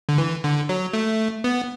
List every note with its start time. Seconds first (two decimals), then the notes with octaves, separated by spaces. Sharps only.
0.09 D3
0.18 E3
0.44 D3
0.69 F#3
0.93 A3
1.44 B3